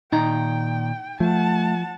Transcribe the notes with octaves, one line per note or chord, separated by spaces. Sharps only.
A#2 D#3 D#4 G5 A#5
F3 A3 F#5 A5